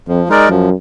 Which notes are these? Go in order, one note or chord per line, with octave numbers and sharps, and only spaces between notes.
F2 F3
G#3 D#4 A#4 D5
F#2 F3